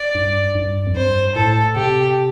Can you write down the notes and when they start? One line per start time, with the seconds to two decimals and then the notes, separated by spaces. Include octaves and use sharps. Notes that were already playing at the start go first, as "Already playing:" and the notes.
Already playing: D5
0.15 G2
0.55 G2
0.87 F2
0.96 G2 C5
1.35 A2 A4
1.76 C3 G4